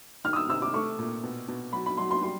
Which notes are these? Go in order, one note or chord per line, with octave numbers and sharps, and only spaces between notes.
D#3 F6
D#6
E6
C3 E6
D6
A3 C#6
A#2
B2
B2
F#3 B5
B5
F#3 C6
C6
G3 C6